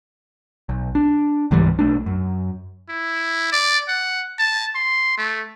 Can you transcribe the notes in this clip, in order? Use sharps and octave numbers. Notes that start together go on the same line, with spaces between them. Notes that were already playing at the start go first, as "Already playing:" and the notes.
B1
D4
C#2 G#2 E3 G3
B1 A3 D4
F#2
E4
D5
F#5
A5
C6
A3